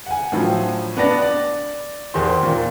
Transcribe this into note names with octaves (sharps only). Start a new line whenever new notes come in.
F#5 G#5
A2 D3 F3 F#3
B3 D4 D5 A#6
D5
E2 D#3 G4 C5 C6
D#2 A#2